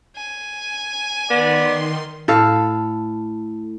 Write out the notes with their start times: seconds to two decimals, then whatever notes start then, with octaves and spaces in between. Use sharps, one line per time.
0.16 G#5
1.30 D#3 B3 D5 C6
2.28 A2 A4 F5